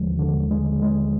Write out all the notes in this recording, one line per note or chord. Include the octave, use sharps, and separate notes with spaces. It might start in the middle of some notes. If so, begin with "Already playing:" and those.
Already playing: D#2 D3 F3 G#3
D3
G#3
G#3